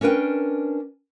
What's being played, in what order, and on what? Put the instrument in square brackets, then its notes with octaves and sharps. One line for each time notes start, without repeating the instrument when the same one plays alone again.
[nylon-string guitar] C#4 D4 A#4 B4 G5